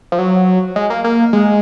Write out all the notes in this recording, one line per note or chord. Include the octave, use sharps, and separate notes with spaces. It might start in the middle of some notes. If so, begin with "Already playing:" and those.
F3
F#3
G#3
A#3
A#3
G#3